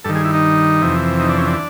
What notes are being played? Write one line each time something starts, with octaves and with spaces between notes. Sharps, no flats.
G2 D#3 A4
G#4
E4
D#4
F2 C3 E3
D#4
D4
C#4
D4